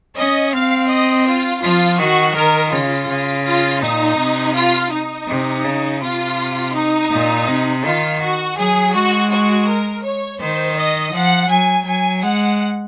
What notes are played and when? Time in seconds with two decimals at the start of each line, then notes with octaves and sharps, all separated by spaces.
0.16 C#4 D#5
0.53 C4 F5
0.89 D#5
1.27 F4
1.62 F3 F4
1.99 D#3 F#4
2.36 D#3 A#4
2.72 C#3 F4
3.09 C#3
3.45 F4
3.82 A#2 D#4
4.19 C3
4.55 F4
4.91 D#4
5.28 C3
5.64 C#3
6.01 C3 F4
6.74 D#4
7.11 A#2
7.47 C3
7.84 D#3 F4
8.20 F#4
8.57 F#3 G#4
8.94 G#3 F#4
9.30 F#4
9.67 A#4
10.03 C#5
10.40 D#3 C5
10.76 D#5
11.14 F3 F#5
11.49 F#3 G#5
11.86 F#3 G#5
12.23 G#3 F#5